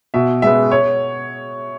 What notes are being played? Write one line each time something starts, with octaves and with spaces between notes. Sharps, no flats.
B2 E5
G#3 B3 E5
C#5